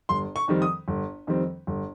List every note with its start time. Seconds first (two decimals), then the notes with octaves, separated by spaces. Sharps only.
0.09 G1 C6
0.36 C#6
0.48 F2 D#3 G3 C4
0.62 D#6
0.88 G1
1.27 F2 D#3 G3 C4
1.67 G1